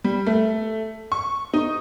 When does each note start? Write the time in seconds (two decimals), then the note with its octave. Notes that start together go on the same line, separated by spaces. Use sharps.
0.04 G3
0.26 A3
1.12 C#6
1.54 D#4